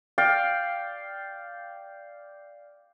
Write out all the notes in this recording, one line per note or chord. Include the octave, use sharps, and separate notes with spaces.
D5 F5 G5